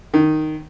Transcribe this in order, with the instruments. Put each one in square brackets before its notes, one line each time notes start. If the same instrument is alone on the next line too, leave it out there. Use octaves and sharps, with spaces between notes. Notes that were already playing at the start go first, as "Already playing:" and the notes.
[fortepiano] D#3